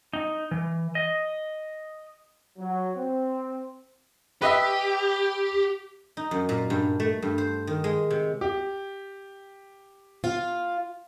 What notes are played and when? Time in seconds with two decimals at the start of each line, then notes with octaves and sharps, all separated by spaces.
0.13 D#4
0.51 E3
0.95 D#5
2.58 F#3
2.96 C4
4.42 G4 B4 D#5 E5
6.17 D#4
6.31 F#2
6.49 A#2
6.70 G2
7.00 A3
7.22 G2
7.38 C5
7.67 D#3
7.84 G#3
8.10 C3
8.41 G4
10.24 F4 F5